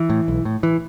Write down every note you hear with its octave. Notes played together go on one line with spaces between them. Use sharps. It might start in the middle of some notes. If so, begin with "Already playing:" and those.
Already playing: E3
A2
B1
A2
E3